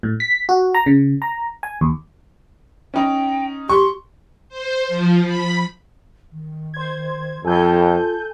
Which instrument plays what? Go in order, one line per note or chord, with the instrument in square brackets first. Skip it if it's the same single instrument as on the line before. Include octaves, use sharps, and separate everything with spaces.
[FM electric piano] A2
B6
F#4
A#5
C#3
A#5
G#5
D#2
[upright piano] C#4 D#4 [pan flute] G5
[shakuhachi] G4 [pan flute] C6 [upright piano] C#6
[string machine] C5
F3
B5
[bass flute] D#3
[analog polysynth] C5 G#6
[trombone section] F2 [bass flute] F4 [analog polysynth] A4 G#5 G6